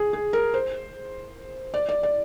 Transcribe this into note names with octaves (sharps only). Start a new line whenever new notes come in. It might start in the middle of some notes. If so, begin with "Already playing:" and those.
Already playing: G#4
G#4
A#4
C5
D5
D5
D5